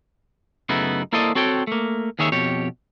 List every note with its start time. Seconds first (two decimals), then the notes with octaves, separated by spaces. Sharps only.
0.69 F#2 C#3 A3 B3 D#4 E4
1.13 A#3 E4 A4 C5 D5 D#5
1.35 C4 F#4 A4 C#5 G5
1.67 A3 A#3
2.19 D#2 D#3 G#4 C#5 E5
2.32 F2 B2 G4 C#5